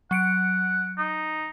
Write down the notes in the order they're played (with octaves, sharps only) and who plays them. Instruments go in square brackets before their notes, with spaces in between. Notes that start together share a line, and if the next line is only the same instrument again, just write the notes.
[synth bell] F#3 C#7 D7 [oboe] F#5
[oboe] D#4